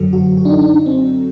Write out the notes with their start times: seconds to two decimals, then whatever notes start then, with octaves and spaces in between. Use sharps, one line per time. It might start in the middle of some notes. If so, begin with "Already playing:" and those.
Already playing: G1 F#2 D3 F#3 A4
0.13 F#4
0.37 F#4
0.45 D4
0.50 D#4
0.62 D4
0.74 D4
0.86 C4